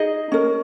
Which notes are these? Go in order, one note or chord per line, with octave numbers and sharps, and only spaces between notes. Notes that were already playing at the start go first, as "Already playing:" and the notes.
Already playing: D#4 G#4 D#5
C#4 A#4